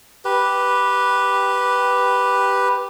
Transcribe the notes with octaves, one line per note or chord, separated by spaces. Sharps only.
G4 B4